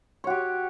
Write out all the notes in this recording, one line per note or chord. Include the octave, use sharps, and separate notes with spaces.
F#4 G4 C#5